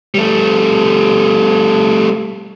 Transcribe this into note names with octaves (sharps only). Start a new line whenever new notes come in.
G3 A3